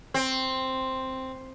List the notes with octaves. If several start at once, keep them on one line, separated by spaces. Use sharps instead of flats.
C4